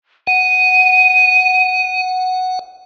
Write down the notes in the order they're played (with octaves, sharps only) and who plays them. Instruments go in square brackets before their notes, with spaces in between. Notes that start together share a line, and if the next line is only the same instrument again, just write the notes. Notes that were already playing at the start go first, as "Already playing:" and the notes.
[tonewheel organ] F#5 [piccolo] D#7